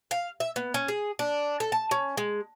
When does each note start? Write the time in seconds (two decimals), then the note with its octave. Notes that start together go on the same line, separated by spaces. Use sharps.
0.11 F5
0.40 E5
0.56 B3
0.74 C#4
0.88 G#4
1.19 D4
1.60 A4
1.72 A5
1.91 C#4
2.17 G#3